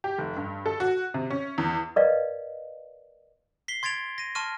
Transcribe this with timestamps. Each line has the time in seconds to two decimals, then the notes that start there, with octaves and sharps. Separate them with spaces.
0.04 G4
0.18 F1
0.36 G2
0.66 A4
0.80 F#4
1.14 C3
1.30 C#4
1.58 E2
1.96 A#4 B4 D5 D#5 F5
3.68 B6 C7 G7
3.83 C6 G#6 A6 D7 F7
4.18 A#6 D#7
4.35 A5 C6 C#6 F6 D#7